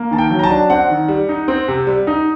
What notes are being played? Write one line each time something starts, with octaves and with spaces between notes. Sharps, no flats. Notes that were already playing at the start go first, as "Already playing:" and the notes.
Already playing: A#3
D#3 A5
G5
F#3
A#5
A5
D4
C4 F#5
D#3
G3
D#4
C4
C3
G3
D#4